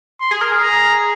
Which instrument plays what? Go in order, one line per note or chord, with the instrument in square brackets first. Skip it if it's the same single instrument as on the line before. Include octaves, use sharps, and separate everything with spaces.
[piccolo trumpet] C6
[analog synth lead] G#4
A#4
G#4
[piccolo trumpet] A#5